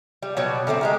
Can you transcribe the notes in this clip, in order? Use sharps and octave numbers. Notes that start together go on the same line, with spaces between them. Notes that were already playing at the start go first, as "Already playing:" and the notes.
G3
B2 F#3 G3
D3 G3 A3 C4
G#3 G4 A#4